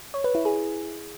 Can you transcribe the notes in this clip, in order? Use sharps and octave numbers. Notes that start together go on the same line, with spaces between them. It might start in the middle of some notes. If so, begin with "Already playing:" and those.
C#5
B4
E4
G#4